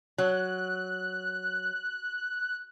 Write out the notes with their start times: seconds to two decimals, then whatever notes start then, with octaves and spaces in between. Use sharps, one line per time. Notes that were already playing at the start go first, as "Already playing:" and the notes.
0.18 F#3 F#6